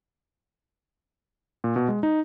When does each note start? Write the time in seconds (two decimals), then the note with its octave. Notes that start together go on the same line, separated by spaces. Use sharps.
1.64 A#2
1.76 B2
1.88 G#3
2.03 D#4